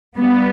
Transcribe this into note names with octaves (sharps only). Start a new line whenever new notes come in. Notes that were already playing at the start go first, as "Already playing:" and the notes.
G3 B3